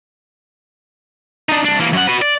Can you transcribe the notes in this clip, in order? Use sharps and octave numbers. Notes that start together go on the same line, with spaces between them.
D4 D#4
C2 D4
E3 A#3
F#2 F#5
F#4 B4
D5